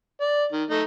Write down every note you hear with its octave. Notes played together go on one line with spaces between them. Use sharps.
D5
D#3
A3 D#4